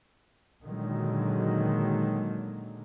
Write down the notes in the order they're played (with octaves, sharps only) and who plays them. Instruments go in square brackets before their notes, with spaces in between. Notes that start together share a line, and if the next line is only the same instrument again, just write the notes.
[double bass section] A#2 D3 D#3 F#3 G#3